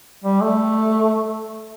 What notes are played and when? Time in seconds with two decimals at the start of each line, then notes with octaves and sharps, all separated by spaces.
0.24 G3
0.41 A3